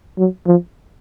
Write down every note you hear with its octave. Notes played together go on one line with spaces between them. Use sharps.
F#3
F3